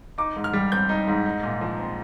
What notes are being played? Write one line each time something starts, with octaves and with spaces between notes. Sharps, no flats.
D#4 D6
G#2
F6
G3
C4 G6
D#4
G#2
D#4
A#2
F3
C4